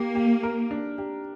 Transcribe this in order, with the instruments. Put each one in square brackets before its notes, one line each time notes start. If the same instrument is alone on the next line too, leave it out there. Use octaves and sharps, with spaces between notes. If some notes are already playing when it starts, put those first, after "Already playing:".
Already playing: [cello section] A#3 [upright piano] G4
[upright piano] G4
A#4
D4
G4